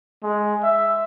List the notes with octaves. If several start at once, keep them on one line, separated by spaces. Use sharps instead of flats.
G#3
E5